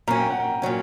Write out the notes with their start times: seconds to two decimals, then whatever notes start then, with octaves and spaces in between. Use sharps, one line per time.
0.08 A#2 F#3 C#4 A#5
0.19 G5
0.30 F#5
0.40 G5
0.62 A#2 F#3 C#4